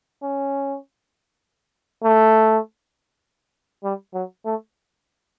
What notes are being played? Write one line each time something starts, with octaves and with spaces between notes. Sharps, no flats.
C#4
A3
G3
F#3
A3